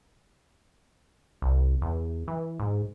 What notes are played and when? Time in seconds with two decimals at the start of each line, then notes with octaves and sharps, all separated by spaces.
1.42 C2
1.82 E2
2.28 E3
2.59 G#2